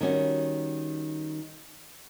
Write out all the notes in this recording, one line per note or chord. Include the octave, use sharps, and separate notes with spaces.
D#3 G3 C#4 F#4